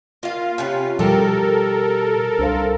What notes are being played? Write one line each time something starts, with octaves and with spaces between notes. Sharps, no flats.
A#3 F4 F5
C3 C#4 B4
B2 F3 G3 G4 A4 A#4 D#5
C2 D4 C5 F5